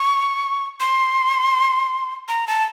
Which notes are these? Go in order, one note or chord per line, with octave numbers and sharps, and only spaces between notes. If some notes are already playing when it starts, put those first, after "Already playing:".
Already playing: C#6
C6
A#5
A5